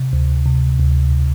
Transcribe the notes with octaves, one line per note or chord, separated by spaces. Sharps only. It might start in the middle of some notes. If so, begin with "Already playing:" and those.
Already playing: C3
D2
C3
D2